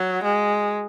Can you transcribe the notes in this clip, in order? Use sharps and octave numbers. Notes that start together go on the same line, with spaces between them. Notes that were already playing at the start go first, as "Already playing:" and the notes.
Already playing: F#3
G#3